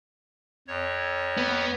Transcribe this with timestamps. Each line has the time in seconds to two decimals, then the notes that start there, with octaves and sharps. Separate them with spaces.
0.67 F2 C#5
1.37 B3